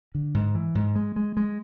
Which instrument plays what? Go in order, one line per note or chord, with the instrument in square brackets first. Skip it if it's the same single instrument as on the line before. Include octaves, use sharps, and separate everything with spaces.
[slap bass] D3
G#2
E3
G#2
G#3
G#3
G#3